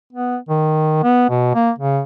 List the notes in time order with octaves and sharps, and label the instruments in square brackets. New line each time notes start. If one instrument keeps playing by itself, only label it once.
[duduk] B3
D#3
B3
B2
A#3
C#3